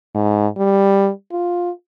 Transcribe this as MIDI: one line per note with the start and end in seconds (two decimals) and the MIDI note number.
0.15 0.47 44
0.57 1.10 55
1.31 1.70 65